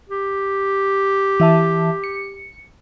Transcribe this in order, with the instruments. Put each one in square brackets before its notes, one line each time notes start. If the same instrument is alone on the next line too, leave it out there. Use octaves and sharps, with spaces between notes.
[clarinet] G4
[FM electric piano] E3 E5 A5
C#7